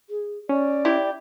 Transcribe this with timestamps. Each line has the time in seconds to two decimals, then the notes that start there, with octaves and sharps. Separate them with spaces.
0.10 G#4
0.49 C#4 D5
0.85 E4 G4